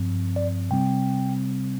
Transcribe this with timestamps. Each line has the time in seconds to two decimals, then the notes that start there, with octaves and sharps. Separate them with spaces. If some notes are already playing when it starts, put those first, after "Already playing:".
Already playing: G2 F3 C4
0.36 D5
0.70 C3 G3 C4 G5